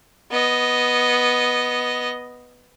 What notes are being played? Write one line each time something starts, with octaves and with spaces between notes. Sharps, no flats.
B3 D#5